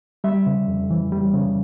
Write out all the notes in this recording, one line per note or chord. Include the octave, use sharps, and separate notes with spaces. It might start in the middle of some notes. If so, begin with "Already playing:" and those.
G3 E5
C#3
F2
E3
G3
C#3